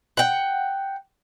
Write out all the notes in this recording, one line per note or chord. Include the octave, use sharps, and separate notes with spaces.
F#5 G5